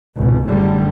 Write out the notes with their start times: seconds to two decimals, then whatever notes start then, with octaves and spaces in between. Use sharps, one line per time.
0.16 G#1 C#2 B2
0.46 F#1 A2 D3 G3